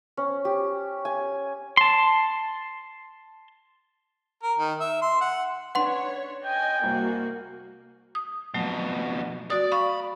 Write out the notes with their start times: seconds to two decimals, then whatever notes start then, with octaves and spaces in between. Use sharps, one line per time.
0.17 C#4
0.45 G4
1.05 G#5
1.77 A5 C6
4.43 A#4
4.59 D#3
4.80 E5
5.02 C6
5.21 F#5
5.75 C#4 D4 B4 C#5 F#5 C6
6.44 D#5 G5 G#5
6.83 C2 A#3 F#4
8.15 D#6
8.54 F2 B2 F#3 A3
9.50 F#4 D5 D#6
9.72 F5 B5 C#6